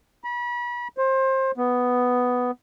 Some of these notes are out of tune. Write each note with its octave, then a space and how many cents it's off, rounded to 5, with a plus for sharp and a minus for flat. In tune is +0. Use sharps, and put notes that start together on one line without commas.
B5 -35
C5 +25
B3 +5